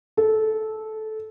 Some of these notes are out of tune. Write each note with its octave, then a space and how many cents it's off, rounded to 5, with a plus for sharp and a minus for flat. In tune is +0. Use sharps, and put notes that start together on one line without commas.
A4 -15